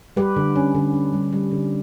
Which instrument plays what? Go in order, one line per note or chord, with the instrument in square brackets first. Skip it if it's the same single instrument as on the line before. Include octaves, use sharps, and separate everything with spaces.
[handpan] G3 G4 B4
D3
C#4
D3
C#4
G3
G3
D3